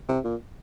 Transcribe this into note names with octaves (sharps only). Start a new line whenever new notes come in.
C3
A#2